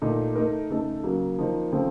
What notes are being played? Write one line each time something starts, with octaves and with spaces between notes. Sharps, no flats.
A#2 A3 D#4
A3 D#4 A#4
C#3 A3 D#4 A4
C#3 F#3 A#3
F3 A#3 D#4
C#3 F3 A3 C4